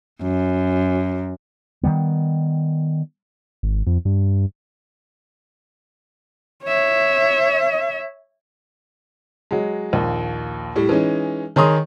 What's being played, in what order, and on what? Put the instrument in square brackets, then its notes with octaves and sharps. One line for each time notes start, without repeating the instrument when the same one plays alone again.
[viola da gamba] F#2
[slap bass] D#3 F#3 G3 B3
[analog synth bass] G#1
F2
G2
[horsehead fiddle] C#5 E5
[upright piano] F#3 G#3
A#1 D#2
A2 G3
E3 G#3 C#4 D#4
D#3 G#4 C#5 A#5 C6 D#6